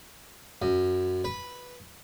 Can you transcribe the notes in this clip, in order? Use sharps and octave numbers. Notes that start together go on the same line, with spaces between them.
F#2
B4